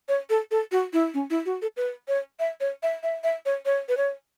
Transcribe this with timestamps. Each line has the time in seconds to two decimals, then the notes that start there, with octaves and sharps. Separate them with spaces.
0.09 C#5
0.30 A4
0.51 A4
0.72 F#4
0.93 E4
1.14 C#4
1.30 E4
1.46 F#4
1.62 A4
1.77 B4
2.08 C#5
2.40 E5
2.61 C#5
2.83 E5
3.03 E5
3.24 E5
3.46 C#5
3.66 C#5
3.89 B4
3.97 C#5